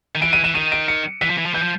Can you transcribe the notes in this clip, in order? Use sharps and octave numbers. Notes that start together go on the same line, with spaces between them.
D#3
E3 D7
D#7
E3 E7
D#3 D#7
D7
C#7
E3 B6
F3
E3
F3
E3 G6
F3